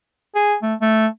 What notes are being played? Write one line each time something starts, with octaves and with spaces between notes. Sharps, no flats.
G#4
A3
A3